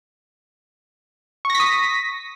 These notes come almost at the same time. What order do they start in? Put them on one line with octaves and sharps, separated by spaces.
C#6 A#6 B6 D#6